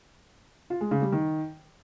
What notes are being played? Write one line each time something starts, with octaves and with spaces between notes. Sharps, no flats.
F4
G#3
C#3
G3
D#3